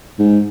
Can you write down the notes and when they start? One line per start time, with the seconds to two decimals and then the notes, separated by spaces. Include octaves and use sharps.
0.19 G#2